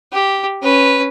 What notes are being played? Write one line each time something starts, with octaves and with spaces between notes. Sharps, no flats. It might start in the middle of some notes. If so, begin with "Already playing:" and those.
G4
C#4 B4